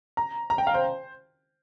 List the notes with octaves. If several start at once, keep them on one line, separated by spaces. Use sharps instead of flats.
A#5
A#5
G5
F5
C5